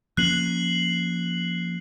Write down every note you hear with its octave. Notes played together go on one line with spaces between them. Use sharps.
F3 A#3 C#4 F#6 C7 F#7